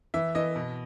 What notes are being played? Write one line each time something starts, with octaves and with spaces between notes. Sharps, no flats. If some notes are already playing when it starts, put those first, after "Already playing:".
E3 E5
E3 D#5
B2